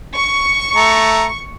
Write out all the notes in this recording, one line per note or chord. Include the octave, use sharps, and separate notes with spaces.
C#6
A3 A#5